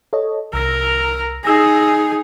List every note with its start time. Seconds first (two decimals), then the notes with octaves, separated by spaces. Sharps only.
0.13 A4 C#5 D#5
0.54 C2 A#4 E6 A#6
1.44 D#4 G#4 E6 A#6